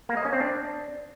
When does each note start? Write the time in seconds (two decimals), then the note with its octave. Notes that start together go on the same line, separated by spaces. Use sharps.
0.09 A#3
0.17 D#5
0.25 C#4
0.33 C4
0.40 D4